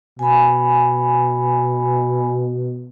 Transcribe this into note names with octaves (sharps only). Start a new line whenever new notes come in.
B2 G#5 B5